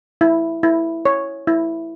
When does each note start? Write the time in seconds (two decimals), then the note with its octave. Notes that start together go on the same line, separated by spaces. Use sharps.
0.21 E4
0.63 E4
1.05 C#5
1.47 E4